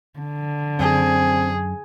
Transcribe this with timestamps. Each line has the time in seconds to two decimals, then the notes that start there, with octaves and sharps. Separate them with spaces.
0.18 D3
0.79 F#2 C4 G#4